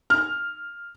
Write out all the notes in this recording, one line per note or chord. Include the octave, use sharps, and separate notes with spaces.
F6